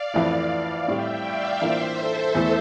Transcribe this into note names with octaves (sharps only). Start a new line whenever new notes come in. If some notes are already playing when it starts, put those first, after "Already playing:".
Already playing: D5 F5
F2 E3 A3 E4
D5 F5
A2 G3 C4 E4 E5 G5
D5 F5
E3 A#3 D4 F4 C5 E5
A4 C5
E2 E3 A3 E4